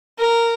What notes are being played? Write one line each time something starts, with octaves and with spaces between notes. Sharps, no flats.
A#4